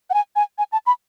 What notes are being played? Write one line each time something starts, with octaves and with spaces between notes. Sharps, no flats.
F#5
G#5
G#5
G#5
A5
B5